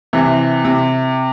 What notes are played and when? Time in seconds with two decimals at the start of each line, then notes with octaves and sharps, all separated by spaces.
0.13 C3 E3
0.65 C3